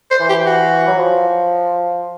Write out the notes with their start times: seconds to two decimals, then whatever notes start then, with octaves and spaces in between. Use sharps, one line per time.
0.11 C5
0.20 E3
0.29 G4
0.46 F#4
0.87 F#3
0.98 F3